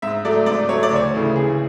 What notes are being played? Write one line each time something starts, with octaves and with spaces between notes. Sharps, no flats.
G#2 E5
F#3 A3 D5
G#2 D5
F#3 A3 C#5
D5
D2 C#5
C#3 E3 A3
D2 G#4